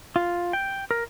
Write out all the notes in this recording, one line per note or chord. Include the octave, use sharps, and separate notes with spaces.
F4
G5
A#4